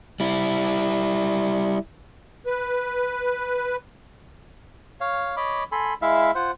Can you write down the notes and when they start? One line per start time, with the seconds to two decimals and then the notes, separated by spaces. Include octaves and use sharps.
0.20 G3 E4
2.46 B4
5.01 C#5 F5
5.37 C#5 D#5 B5 D6
5.72 A4 G#5 B5 C6
6.02 G#3 E4 E5 F5
6.35 F4 C5 F#5